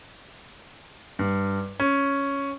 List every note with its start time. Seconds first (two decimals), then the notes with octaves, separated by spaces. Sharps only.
1.19 G2
1.80 C#4